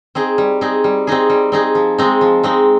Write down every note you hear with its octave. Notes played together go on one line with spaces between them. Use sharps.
C4 D#4 G#4
G3
C4 D#4 G#4
G3
C4 D#4 G#4
G3
C4 D#4 G#4
F3
G#3 C4 D#4
F3
G#3 C4 D#4